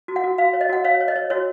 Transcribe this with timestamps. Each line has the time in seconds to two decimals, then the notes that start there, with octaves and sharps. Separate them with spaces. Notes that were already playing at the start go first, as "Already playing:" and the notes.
0.08 F#4
0.16 F#5
0.24 F#4
0.38 F#4 F5
0.53 C#5
0.61 D#5
0.69 F#4 F#5
0.84 C#5 F5
1.00 C#5
1.08 D#5
1.16 C#5
1.30 F#4 C#5